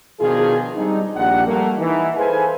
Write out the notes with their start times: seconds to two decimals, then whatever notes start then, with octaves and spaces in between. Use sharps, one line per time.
0.20 B2 D#3 F3 D4 F4 G#4
0.75 G3 G#3 C4 D4 D#4
1.16 A#1 G2 A#2 F3 G4 F#5
1.46 G3 A3 A#3
1.78 E3 D#4
2.16 G#4 A4 B4 C5 F5 G#5